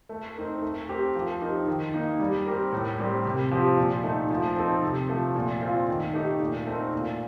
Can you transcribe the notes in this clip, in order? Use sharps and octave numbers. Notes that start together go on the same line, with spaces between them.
A3
C4 D#4 A#4
A3
C4 G4 A#4
F3
C4 D#4 G4 A#4
D#3
A#3 D#4
G3
C4 G4 A#4
A2
G3 C4 G4 A#4
C3
F3 C4 G4
A#2
A3 D#4
F3
C4 D#4 A4
C3
F3 A3
A#2
A3 C4 F4
D#3
A3 D#4 G4
A#2
A3 C4 D#4 A#4
A#2